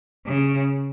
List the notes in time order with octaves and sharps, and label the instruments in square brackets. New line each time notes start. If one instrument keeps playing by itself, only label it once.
[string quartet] C#3